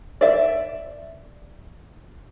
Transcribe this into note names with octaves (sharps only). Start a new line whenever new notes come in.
D5 E5